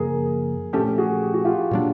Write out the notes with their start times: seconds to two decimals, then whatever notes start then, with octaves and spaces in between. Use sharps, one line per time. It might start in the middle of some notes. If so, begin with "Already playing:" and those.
Already playing: F#2 C#3 F3 A#3 G#4 A#4
0.73 A#2 F3 A3 C#4 G4 A4
0.98 F#4 G#4
1.23 G4
1.34 F#4
1.45 F4 G4
1.71 A#2 F#3 A#3 D4